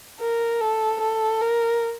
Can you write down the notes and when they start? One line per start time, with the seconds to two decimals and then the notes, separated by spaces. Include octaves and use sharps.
0.20 A#4
0.61 A4
1.01 A4
1.41 A#4